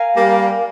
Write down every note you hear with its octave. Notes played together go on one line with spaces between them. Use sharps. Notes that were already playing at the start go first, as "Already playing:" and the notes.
Already playing: A#4 F5 G#5
G3 A#3